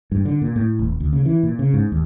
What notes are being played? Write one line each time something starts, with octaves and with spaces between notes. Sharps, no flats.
G2
D3
A#2
A2
D#1
D2
C#3
E3
A#2
C#3
G#2
D#2